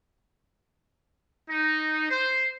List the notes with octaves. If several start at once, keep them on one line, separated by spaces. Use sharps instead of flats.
D#4
C5